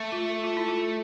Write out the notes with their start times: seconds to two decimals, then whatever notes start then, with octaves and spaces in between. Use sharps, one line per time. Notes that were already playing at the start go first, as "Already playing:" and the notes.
Already playing: A3
0.12 F4
0.44 F4
0.57 E4
0.68 F4